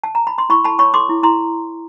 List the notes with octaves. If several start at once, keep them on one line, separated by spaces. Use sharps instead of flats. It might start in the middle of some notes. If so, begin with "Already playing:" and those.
A5
A#5
B5
C6
E4 B5 C#6
A4 A5 B5
C#5 B5 C#6
A4 C6 D6
E4
E4 A#5 C6